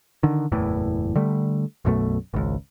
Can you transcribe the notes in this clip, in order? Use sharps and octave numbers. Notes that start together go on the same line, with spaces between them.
D3 D#3
F#1 E2 A2 E3
D3 G3 A3
B1 F#2 B2 A3
G#1 C#2